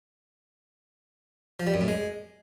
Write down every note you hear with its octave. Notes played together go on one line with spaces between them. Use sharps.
F3
G3
F#2
A2
G#3